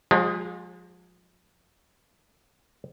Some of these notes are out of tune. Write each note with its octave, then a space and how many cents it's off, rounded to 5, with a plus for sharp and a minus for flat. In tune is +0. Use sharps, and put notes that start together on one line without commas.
F3 +40 G#3 +0 G4 +40